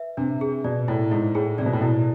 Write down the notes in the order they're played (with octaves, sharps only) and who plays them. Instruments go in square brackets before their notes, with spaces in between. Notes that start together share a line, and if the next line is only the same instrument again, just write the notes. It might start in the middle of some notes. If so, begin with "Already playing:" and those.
Already playing: [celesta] B4 E5
[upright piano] C3 [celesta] D4
[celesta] G#4
[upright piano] B2 [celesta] D5
[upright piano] A2 [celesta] E4
[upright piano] G#2 [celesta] E4
[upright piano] A2 [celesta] G#4
[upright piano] C3 [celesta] D5
[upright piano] B2
A2
[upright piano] B2 [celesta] E4